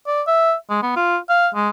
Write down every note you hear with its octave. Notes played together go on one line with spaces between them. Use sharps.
D5
E5
G#3
B3
F4
F5
G#3